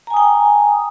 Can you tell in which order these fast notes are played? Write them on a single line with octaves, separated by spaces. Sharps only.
A#5 G#5 D#6 G5